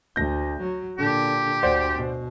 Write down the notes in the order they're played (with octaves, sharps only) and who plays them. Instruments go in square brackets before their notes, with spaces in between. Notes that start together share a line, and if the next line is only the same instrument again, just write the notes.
[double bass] D2 [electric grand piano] G6 A#6
[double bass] F#3
[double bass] A#2 D3 [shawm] G4
[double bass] D2 [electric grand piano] C5 D5 F#5
[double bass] B2